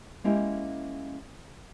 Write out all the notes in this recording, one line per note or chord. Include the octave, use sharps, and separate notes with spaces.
G#3 A#3 C#4 E4 G4